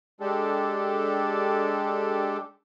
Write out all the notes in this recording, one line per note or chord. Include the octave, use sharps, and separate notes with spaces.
G#3 D4 G4 A4